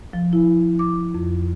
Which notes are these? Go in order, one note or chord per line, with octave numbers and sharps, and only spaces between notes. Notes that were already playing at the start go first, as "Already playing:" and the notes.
F3
E4
D6
F2